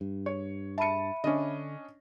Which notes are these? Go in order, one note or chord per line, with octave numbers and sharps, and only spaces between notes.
G2
C#5
E5 A5 B5 C#7 D#7
D3 C#4 D4 D#5